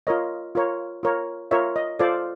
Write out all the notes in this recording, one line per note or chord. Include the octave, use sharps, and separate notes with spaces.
F4 A#4 C#5 D#5
F4 A#4 C#5
F4 A#4 C#5
F4 A#4 C#5 E5
D#5
F4 A4 C5 D5